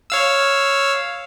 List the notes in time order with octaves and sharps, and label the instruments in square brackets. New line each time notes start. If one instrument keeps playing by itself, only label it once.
[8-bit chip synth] C#5 F5 E6